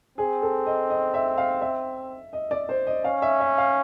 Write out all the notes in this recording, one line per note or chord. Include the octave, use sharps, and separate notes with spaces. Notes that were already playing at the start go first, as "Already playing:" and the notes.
C4 G#4
A4
D#5
D#5
E5
F5
E5
D#5
D5
C5
D#5
C#4 F5
E5
E5
F5